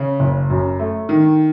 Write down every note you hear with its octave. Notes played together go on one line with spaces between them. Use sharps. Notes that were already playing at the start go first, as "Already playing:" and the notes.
Already playing: C#3
F#1
F#2
A3
D#3